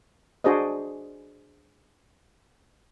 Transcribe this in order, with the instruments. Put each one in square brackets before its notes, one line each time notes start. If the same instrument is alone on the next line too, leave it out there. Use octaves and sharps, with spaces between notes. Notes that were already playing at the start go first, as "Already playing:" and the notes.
[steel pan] D4 F#4 G#4 C5 D5 D#5